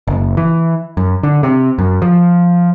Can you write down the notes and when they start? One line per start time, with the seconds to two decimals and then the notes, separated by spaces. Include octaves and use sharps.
0.07 F#1
0.37 E3
0.97 F#2
1.23 D3
1.43 C3
1.79 F#2
2.02 F3